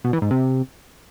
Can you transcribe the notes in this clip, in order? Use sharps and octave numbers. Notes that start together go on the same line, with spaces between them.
B2
E3
G#2
C3